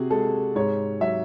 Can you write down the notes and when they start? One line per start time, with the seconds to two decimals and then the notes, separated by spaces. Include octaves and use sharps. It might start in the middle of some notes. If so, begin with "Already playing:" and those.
Already playing: C3 F#4 G#4
0.10 G#3 A4
0.56 G#2 C#5
1.01 F#3 E5